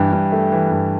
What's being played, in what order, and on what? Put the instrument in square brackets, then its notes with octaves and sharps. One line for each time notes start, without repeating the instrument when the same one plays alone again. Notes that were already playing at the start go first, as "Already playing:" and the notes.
Already playing: [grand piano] G2 E3 [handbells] G5
[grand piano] G2
A3
E3
G2